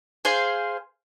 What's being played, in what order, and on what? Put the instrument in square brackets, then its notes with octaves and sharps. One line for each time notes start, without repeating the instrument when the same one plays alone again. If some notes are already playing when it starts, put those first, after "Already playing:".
[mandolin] G#4 C5 F5 G#5